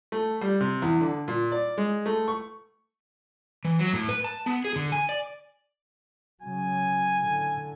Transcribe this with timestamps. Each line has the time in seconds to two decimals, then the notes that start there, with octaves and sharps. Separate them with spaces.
0.12 A3
0.41 G3
0.60 C3
0.82 E2
1.00 D3
1.28 A#2
1.52 D5
1.78 G#3
2.06 A3
2.28 C#6
3.65 E3
3.79 F#3
3.93 A2
4.09 B4
4.24 A5
4.46 B3
4.65 G#4
4.76 D3
4.92 G#5
5.09 D5
6.42 C#3 F#3 G#5
7.18 A2 D3